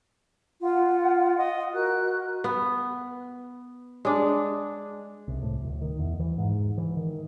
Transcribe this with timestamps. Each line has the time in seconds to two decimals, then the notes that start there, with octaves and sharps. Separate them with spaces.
0.61 F4 F#5
1.37 D#5
1.73 F#4 A#4 F#6
2.44 B3
4.05 G#3 D4
5.28 C2
5.43 A2
5.62 D1
5.82 D#3
5.99 E2
6.20 E3
6.38 G#2
6.78 E3
6.97 D#3